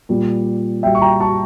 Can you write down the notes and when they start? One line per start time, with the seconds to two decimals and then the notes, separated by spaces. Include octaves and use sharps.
0.09 A#2 G3
0.83 A#2 G3 E5 G5
0.95 C#6
1.01 G5 A#5
1.20 A5 C#6